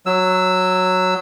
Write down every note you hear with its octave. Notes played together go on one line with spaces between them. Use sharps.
F#3 E6